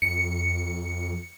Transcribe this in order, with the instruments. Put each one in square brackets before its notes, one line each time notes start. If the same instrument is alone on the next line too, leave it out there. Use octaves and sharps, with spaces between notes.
[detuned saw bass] F2 [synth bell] C#7